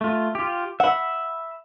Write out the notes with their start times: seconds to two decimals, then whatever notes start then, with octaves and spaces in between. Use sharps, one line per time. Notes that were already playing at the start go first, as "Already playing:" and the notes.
0.01 A3 F4
0.35 F4 G4
0.80 E5 F#5 B5